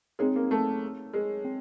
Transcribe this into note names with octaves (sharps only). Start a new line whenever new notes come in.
G#3 C4 D#4 G#4 C#5
A#3
A3
G#3
C4